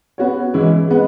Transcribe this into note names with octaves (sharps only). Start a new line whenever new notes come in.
B3 F#4 C#5
E3 G#3 C#4 E4
G#3 B3